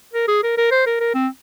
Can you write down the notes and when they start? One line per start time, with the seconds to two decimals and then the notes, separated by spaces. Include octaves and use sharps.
0.13 A#4
0.28 G#4
0.43 A#4
0.57 A#4
0.71 C5
0.86 A#4
1.00 A#4
1.14 C4